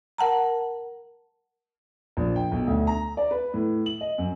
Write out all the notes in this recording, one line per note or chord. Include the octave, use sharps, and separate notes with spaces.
A#4 F#5 A5 A#5
A#1
G5
B1
D2
A#5
D5
B4
A2
F#7
D#5
F#2